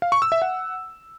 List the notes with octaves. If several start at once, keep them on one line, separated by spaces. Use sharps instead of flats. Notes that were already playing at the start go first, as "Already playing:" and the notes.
F5
C#6
E6
E5
F#5